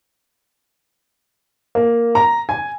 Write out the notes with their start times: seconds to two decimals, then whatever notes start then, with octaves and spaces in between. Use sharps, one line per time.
1.75 A#3
2.15 A#5
2.49 G#5